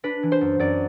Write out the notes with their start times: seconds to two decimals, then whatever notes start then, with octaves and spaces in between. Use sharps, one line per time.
0.04 D4 B4
0.23 E3
0.32 C5
0.41 F#2
0.59 F#2 D5